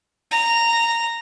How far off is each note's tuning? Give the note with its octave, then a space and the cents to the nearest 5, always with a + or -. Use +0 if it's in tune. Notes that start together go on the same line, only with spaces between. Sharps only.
A#5 -10